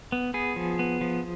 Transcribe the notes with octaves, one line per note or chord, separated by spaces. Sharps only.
B3
B3 G#4
F3
B3
F3